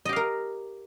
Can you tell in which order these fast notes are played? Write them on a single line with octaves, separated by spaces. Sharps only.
D#5 G4 F5 A#4